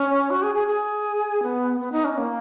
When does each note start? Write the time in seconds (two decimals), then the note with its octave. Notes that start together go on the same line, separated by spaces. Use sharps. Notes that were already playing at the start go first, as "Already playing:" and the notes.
Already playing: C#4
0.30 F#4
0.43 G#4
0.55 G#4
0.68 G#4
1.43 B3
1.80 B3
1.92 D#4
2.05 C#4
2.18 A#3